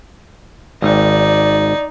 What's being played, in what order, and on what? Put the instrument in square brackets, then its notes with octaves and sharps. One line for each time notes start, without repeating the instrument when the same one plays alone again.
[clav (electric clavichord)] G#1 [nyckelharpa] D#4 [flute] D5